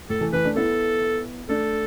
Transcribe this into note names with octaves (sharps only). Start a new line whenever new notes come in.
A2 A4
E3 A3
E3 A3 B4
A3 D4
B3 E4 A4
A3 D4 A4